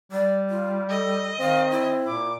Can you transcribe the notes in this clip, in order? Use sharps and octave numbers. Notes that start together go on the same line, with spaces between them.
G3 D5
F4
A4 D#5
D#3 C4 F5
E4
A#2 D6